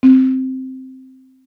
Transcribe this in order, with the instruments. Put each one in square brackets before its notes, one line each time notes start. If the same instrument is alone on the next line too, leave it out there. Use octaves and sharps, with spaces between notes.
[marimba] C4